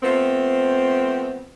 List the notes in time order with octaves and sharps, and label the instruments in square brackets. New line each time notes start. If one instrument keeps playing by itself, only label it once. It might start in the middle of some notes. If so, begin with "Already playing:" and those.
[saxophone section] F3 A3 B3 C4